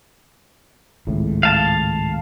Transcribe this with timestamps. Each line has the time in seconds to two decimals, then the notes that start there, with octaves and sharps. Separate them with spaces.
1.07 G#1 C#2 A2
1.43 F5 A5